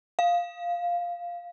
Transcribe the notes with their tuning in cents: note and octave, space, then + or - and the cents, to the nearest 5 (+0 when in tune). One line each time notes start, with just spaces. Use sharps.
F5 +0